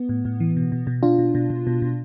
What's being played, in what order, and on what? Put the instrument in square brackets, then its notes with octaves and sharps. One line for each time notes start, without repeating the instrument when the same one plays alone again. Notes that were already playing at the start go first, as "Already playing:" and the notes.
Already playing: [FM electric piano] B3
A2
A2
E3
B2
B2
B2
B2 D4 F4
B2
B2
B2
B2
B2